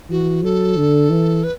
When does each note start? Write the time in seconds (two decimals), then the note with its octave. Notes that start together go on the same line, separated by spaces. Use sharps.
0.10 E3 F#4
0.43 F#3 A4
0.77 D3
1.10 E3
1.44 B4